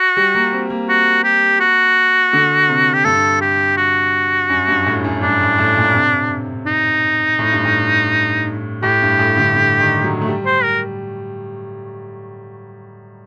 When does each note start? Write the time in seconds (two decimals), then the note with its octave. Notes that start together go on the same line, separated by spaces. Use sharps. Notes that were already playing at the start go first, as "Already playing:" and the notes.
Already playing: F#4
0.17 G3
0.35 A#3
0.52 C4
0.70 A#3
0.89 F#4
1.24 G4
1.60 F#4
2.33 D3
2.69 C3
2.93 G4
3.05 G2 A4
3.41 G4
3.77 F#4
4.49 F#2
4.68 G2
4.86 A2
5.04 F#2
5.21 G2 D4
5.40 A2
5.58 A2
5.76 A#2
5.94 C3
6.66 D#4
7.39 A2
7.52 G2
7.65 A2
8.83 A2 G4
9.02 G2
9.19 A2
9.37 D3
9.56 D3
9.80 D#3
10.04 F#3
10.21 A3
10.28 G3
10.46 C5
10.64 A#4